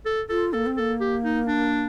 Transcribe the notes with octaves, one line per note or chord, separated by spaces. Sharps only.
A4
F4 A4
A#3 A4
C4
A#3 A4
G4
D#4
D4